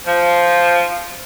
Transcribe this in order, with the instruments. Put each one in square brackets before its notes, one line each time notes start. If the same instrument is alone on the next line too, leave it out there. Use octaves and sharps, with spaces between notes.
[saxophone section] F3